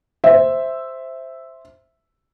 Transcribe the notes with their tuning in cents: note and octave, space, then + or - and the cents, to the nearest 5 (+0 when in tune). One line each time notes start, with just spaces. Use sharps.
C5 +0 E5 +0